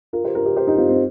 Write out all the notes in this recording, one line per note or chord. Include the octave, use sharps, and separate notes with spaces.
F4 A#4
G4 C5
F4 A#4
G4 C5
G4 C5
D#4 G4
C4 F4
C4